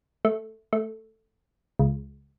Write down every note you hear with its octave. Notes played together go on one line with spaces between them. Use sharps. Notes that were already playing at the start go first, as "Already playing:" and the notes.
A3
A3
C#2